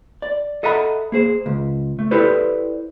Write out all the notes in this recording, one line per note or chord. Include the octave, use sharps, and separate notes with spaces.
D5
A4 D#5 E5 F#5 A#5 B5
A#3 G#4 C5
C#2
A3
E4 G4 A4 B4 C5 D5